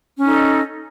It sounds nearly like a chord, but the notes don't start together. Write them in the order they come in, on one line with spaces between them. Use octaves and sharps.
C#4 D#4 A4 D#5